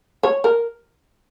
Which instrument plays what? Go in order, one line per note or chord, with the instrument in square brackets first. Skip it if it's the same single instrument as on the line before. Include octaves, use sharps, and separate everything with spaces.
[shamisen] C#5
A#4